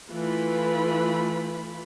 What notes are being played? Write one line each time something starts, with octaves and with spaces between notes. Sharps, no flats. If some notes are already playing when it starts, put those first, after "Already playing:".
E3 A3 F4 B5